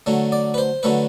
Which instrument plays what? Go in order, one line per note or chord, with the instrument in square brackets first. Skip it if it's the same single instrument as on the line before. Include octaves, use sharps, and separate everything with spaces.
[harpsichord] D3 F#3 A3
D5
B4
C5
D3 F#3 A3 B4